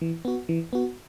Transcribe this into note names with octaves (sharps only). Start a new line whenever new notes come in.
E3
B3 F#4
E3
B3 F#4